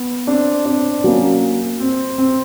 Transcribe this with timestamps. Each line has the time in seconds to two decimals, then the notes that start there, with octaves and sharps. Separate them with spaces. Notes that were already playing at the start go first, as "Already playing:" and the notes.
Already playing: B3
0.27 C4 D4
0.65 C4 D4
1.04 F#3 A#3 C#4
1.80 C4
2.18 C4